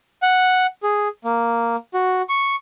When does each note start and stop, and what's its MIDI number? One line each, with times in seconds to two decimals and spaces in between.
0.22 0.67 78
0.83 1.08 68
1.24 1.76 58
1.94 2.22 66
2.29 2.55 85